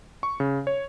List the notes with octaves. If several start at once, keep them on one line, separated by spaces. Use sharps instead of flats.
C#6
C#3
C#5